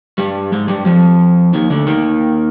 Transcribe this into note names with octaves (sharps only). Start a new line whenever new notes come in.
G2 G3
G#2 G#3
G2 G3
F2 F3
D#2 D#3
D2 D3
D#2 D#3